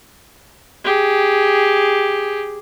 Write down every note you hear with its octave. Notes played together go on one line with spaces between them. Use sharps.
G4 G#4